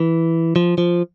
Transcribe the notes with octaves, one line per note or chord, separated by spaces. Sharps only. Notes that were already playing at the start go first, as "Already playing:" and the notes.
Already playing: E3
F3
F3